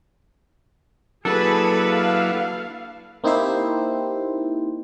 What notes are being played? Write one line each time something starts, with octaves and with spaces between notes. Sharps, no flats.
F#3 A#3 D4 E4 G#4 A4 B4 B5
F5
A#3 C4 D#4 E4 G4 C5